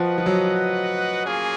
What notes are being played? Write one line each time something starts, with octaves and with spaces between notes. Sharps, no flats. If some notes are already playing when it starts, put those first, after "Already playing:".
Already playing: F3 F#4 B4 D#5 F#5
F3
F#3
A#3 C#4 F4 G#4